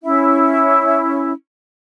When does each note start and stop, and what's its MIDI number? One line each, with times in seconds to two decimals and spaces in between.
0.03 1.32 61
0.03 1.32 64
0.03 1.32 76